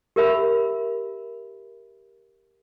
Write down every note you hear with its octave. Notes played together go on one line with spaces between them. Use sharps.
G4 A#4 E5 B5